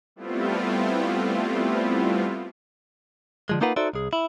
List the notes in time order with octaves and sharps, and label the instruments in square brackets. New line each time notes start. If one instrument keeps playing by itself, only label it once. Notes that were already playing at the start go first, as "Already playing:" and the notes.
[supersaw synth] G3 A3 B3 C4 E4 F4
[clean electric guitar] D3 F3 G#3
A#3 D#4 F4 A#4 B4 F#5
D#4 F#4 A4 C5 D5 E5
C2 G#4
E4